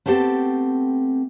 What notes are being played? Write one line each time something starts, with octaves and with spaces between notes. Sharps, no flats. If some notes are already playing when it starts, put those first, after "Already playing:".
A3 B3 C4 G4 A4